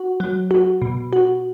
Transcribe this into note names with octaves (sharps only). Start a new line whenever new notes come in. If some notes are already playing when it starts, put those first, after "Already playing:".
Already playing: F#4
F#3
F#4
B2
F#4